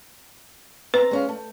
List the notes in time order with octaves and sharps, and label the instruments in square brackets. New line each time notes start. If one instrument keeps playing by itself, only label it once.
[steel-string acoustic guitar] C4 A#5 [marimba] B4
[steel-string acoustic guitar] G#3 C#4 F5
A3